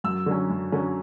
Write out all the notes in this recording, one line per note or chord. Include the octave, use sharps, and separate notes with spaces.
F#2 E6
D3 F#3 C#4
F#2
D3 F#3 C#4